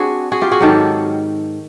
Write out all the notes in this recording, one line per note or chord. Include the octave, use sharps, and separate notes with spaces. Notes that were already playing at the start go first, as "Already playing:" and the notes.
Already playing: C4 D4 F#4 G#4
F#4 G#4
F4 G4
F#4 G#4
G#2 D#3 F#3 G4 A4